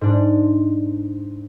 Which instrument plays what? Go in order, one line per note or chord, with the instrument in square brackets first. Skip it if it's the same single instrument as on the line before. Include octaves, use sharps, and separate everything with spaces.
[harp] G#2 D4